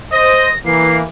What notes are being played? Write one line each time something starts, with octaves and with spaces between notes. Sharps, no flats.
C5 D#5 A#6
E3 A#3 C7